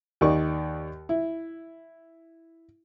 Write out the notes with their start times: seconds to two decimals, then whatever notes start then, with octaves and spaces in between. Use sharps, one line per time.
0.21 D#2 D#3 D5 C#6
1.09 E4